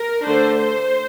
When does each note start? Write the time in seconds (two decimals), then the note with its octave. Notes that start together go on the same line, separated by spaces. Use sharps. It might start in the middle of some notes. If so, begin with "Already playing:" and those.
Already playing: A#4
0.25 D3 A3 D4 C5
0.58 C5